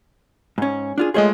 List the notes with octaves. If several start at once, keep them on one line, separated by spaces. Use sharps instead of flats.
G#2 C#4
D4 F4 G#4
G#3 A3 F4 G#4 C#5 D#5